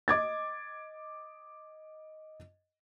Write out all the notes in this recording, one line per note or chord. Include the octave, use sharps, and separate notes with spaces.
D#5 D6 G#6 A6